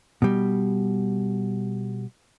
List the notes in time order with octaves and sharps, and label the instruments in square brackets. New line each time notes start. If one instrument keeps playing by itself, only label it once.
[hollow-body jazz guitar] B2 G3